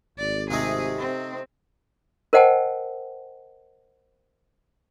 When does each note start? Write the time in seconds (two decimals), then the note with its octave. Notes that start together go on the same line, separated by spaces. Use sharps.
0.18 G#1 D5
0.51 C3 A3 D#4 G#4
0.98 C4
2.33 A#4 C5 D#5 F#5 G5 A5